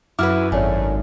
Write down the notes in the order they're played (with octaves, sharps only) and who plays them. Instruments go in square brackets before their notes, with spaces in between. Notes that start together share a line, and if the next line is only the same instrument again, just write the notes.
[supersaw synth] F#2 [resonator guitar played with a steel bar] E4 F#4 B4 [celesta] D6 F6
[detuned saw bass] G#1 [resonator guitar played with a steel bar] A3 [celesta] C#5 D5 G#5